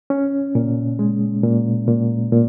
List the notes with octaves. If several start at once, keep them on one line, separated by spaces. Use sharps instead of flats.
C#4
A#2
G#3
A#2
A#2
A#2